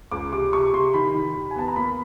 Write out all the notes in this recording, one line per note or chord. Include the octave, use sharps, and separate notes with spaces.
C#2 D6
C3 D6
C3 C#6
C3 C6
D#3 B5
D#3
D#2
G#5
B3 A5
A#5
A#3 B5